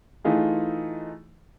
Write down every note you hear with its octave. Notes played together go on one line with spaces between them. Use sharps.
E3 A3 D#4 F4 G#4